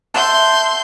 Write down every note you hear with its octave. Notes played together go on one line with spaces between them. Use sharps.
E5 F#5 A5 C6 G6